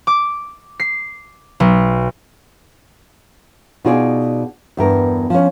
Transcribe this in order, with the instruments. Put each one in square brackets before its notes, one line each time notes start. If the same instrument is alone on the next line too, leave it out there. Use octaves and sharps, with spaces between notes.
[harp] D6
C7
B1
[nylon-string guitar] B2 D#4 F4 G#4 D5
E2 G2 A#4
F3 C#4